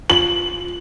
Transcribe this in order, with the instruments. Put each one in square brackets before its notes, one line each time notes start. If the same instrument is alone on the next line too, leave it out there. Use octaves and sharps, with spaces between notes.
[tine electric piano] F4 [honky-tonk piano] F#7